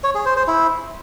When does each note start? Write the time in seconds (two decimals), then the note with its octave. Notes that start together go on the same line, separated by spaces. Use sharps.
0.04 C#5
0.15 G#4
0.26 C5
0.36 C5
0.47 E4